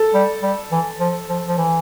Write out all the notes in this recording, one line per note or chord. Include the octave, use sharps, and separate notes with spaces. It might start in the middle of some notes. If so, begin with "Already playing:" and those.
Already playing: A4
G3
G3
E3
F3
F3
F3
E3